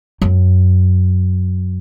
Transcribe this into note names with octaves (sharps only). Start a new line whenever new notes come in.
F#2